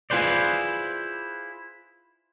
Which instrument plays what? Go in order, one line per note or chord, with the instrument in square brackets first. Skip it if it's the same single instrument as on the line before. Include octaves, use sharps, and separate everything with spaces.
[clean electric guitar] E4 F4 G#4 B4 C5 D5